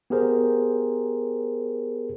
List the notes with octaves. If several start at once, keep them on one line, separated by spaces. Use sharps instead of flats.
B3 G4 G#4 A#4 C5